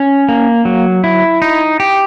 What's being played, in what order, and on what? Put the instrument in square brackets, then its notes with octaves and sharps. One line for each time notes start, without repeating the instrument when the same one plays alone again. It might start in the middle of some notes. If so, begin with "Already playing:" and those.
Already playing: [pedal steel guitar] C#4
A#3
F#3
E4
D#4
G4